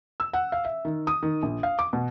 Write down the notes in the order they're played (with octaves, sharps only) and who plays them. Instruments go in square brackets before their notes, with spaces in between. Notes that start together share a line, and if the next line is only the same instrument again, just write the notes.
[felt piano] E6
F#5
F5
E5
D#3
D#6
D#3
A#1
F5
D6
B2